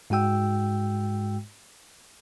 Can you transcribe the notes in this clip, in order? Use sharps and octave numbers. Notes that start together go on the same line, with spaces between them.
G#2 G#3 F#4 G5 E6